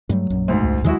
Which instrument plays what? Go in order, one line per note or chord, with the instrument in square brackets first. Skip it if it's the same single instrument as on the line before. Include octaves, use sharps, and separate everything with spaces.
[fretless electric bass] G2 G3 A3 [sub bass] F#3
[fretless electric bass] A#1 F#2
[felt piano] D2 G#2
[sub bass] C#2
[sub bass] D#2 [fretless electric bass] D#3 E3 F#3 [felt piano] G#3 E4 F#4